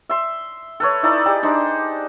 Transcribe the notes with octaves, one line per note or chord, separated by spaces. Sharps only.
E5 C6
A4 B4 C#5
D#4 E4 A4 D5
G4 G#4 D5
D4 D#4 C5